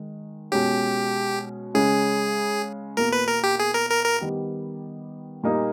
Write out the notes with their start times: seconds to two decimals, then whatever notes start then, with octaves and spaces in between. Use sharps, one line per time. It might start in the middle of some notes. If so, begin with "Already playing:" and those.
Already playing: D#3 G#3
0.52 B2 G#3 C#4 G4
1.74 C#3 G#3 C#4 G#4
2.97 E2 B2 A#3 A#4
3.13 B4
3.28 A#4
3.44 G4
3.60 G#4
3.74 A#4
3.90 A#4
4.05 A#4
4.20 D#3 G3 B3 G4
5.43 A#2 G3 A#3 D#4